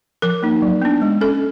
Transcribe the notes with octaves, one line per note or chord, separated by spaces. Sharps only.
F3 A#4
A#3 D#4
F#3
B3 D4
G#3
C#4 A4